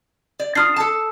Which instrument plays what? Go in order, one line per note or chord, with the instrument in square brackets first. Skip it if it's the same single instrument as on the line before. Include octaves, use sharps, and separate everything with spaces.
[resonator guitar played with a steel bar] D5
[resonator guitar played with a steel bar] D4 F4 [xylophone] D#6 F6 C7
[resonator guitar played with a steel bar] A4 A5